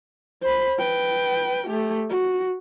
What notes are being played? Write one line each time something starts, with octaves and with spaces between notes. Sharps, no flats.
C5 B5
B4 G5
A3 G4
F#4